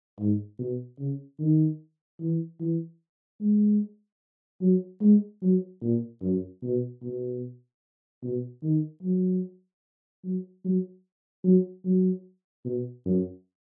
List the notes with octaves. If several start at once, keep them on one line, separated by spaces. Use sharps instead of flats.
G#2
B2
C#3
D#3
E3
E3
G#3
F#3
G#3
F#3
A#2
F#2
B2
B2
B2
D#3
F#3
F#3
F#3
F#3
F#3
B2
F#2